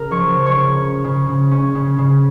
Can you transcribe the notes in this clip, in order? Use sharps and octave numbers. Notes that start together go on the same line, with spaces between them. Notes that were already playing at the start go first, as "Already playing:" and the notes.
Already playing: C#3 A#4 A#5
F3 C#5 C#6
C#3
C#5 C#6
C#3
C#4
C#3
C#3
C#4
C#3
C#3